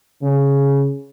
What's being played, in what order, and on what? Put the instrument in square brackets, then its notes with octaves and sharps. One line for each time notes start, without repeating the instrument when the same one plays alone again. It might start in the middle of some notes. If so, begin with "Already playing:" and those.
[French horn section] C#3